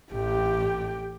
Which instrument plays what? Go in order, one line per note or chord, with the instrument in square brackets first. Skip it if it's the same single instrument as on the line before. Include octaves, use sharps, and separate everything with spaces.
[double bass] A1 [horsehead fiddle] G4 G5